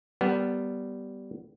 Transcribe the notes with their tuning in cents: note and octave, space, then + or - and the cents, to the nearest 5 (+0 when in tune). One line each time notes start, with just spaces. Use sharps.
G3 -15 B3 +0 A#4 -25